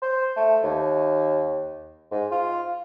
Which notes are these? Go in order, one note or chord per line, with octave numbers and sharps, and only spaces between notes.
C5
A3
D#2
G#2
F4